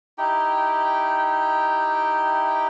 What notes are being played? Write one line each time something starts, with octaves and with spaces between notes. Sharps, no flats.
D#4 E4 G4 G5